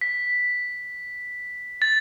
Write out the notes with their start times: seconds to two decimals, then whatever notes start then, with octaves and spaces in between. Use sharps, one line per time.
0.01 B6
1.82 A6